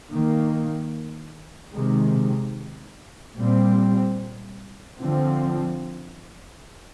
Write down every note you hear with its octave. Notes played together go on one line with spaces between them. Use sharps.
D#3 A#3
C3 D#3 G#3
A#2 G3 C4
D3 F3 C4